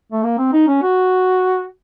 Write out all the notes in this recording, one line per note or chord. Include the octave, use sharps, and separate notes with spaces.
A3
A#3
C4
D#4
C#4
F#4